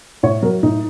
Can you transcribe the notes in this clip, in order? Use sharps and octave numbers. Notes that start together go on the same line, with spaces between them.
A2 C#5
F#3 A#4
A2 D#4